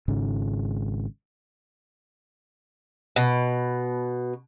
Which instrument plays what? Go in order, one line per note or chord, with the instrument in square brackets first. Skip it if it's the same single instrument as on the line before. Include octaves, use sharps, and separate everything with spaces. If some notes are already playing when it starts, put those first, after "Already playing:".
[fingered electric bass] G#1 G#2 C#3 G#3
[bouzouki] B2